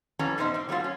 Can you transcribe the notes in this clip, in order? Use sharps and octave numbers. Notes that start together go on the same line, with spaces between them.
F2 E3 G3 C#4 A4 A#5
E2 B2 D#4 C5 E5
G#2 C4
F#3 G3 A3 B3 C4 F4
F#2 C#4